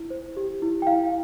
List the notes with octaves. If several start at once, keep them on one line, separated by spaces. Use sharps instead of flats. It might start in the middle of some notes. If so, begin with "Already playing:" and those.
Already playing: E4
C5
G4
E4
G5
E4 F5